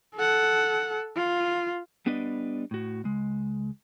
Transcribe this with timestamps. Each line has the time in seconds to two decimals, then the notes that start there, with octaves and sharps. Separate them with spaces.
0.16 A4 F#5
1.16 F4
2.06 G3 B3 D4 B4 D5 D#5
2.71 A2 F#4
3.04 C#2 G#3